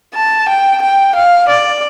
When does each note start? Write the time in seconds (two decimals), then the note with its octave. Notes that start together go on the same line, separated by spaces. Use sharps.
0.15 A5
0.48 G5
0.82 G5
1.15 F5
1.49 D5